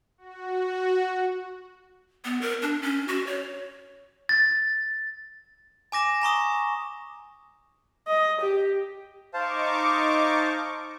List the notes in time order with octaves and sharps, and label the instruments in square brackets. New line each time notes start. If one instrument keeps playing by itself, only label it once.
[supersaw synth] F#4
[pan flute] B3
A#4
D4
C#4
F#4
C#5
[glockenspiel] A6
G#5 D6 A#6 E7
G#5 A#5 C#6 D#6
[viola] D#5
G4
[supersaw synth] D#4 C#6 D6 [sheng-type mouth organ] C5 F5 A5